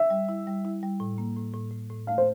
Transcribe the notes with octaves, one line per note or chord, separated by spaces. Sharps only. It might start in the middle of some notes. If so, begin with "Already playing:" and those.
Already playing: E5
G3
E4
G3
E4
G3
A2
A#3
A2
A2
A2
A2
A3 F5
C5